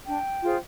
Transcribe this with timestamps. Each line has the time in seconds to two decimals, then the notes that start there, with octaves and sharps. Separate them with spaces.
0.05 D4 G5
0.43 F4 G#4 C5